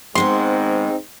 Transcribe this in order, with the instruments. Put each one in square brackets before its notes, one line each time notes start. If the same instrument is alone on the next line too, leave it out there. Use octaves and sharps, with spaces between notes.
[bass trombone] G#2 [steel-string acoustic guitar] D#3 G#3 B3 [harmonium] C4 D#4 [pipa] C6